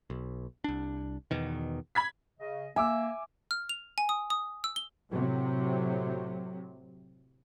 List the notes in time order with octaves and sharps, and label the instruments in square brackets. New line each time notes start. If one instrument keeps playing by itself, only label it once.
[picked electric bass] B1
C2 D4
E2 B2 D#3
[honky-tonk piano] B5 G#6 B6
[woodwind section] C#3 D#5
[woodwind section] A#3 [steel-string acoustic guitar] E5 [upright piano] G#5 D6 E6
[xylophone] F6
F7
G#5
D#6
D#6
E6
G7
[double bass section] A2 C3 F#3